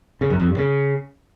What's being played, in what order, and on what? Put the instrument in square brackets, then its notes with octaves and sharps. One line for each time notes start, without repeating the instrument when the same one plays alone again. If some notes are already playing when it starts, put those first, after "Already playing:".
[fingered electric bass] C#3
F#2
F2
G2
C#3